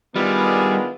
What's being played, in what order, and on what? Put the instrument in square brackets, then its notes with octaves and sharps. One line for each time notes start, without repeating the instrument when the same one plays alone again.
[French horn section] D#3 B3 [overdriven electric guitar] G3 [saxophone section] G#3 E4 F4 [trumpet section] D4 G#4